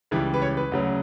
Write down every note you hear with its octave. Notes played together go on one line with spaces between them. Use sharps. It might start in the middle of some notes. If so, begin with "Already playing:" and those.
C#2 C#3 E3 G3
B4
C#5
B4
D2 C#3 F#3